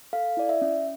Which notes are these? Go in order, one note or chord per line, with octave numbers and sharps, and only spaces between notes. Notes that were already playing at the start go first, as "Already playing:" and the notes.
A4 F5
E4 D5
E5
C#4